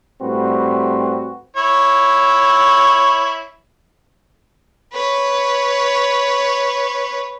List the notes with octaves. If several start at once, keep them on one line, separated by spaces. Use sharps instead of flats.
A2 G3 C4 F#4 B4
E4 C#5
B4 C#5